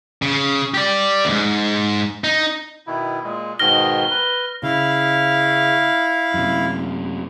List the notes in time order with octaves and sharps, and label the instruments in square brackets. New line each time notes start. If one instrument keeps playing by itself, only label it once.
[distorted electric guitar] C#3
G4 D5
D2 G#2
D#4
[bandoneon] B2 D#3 E4
A#2 G#3
[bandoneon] G#2 B2 D#3 [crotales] F6 A#6 G7
[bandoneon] B4
[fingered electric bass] C#3 [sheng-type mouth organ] E4 F5
[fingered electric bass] F#2 C3